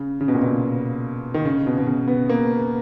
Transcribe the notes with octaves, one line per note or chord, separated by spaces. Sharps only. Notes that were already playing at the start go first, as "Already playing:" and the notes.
Already playing: C#3
C#3
B2
A#2
B2
D#3
C#3
B2
B2
C#3
B3
A#3